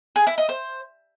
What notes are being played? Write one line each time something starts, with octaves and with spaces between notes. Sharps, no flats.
G#4
E4
D#5
C5